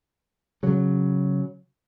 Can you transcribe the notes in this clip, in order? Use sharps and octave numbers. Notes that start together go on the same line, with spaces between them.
C#3 F#3